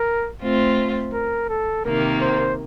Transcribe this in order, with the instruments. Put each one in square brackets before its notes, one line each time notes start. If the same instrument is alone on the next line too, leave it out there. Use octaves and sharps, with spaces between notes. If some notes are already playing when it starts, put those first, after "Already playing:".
Already playing: [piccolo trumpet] A#4
[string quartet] A3 C4 F4
[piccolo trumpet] A#4
A4
[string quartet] C3 D#3 A#3 [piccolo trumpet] A#4
[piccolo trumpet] C5